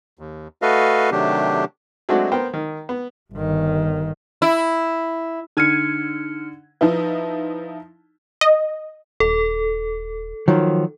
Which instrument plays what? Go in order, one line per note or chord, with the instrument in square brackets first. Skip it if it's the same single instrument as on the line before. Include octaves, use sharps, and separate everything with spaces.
[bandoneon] D#2
A3 F#4 A4 B4 D#5 F5
C3 D#3 F#3 A3 D4 G4
[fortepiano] F#3 G#3 A3 C4 D4 F#4
B3 A#4 C5 G5
D#3
B3
[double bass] G1 D#3
[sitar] E4
[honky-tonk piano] D3 G#6 D#7 [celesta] D#4 F6 C#7
[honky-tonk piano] F3 D#4 E4 [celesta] B4
[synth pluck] D#5
[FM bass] D#1 [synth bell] A4
[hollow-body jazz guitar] D#3 F3 F#3